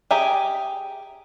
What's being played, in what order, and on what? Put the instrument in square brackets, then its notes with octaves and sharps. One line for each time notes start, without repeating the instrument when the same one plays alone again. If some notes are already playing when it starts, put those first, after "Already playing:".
[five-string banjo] G4 G#4 E5 G#5 A#5